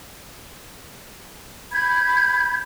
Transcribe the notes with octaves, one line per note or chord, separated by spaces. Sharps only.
B5 G6 G#6